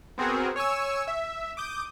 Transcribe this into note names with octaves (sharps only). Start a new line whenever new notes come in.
B3 C4 F#4 G#4 A#4
C#5 G#5 C#6 E6
E5
D6 D#6 G6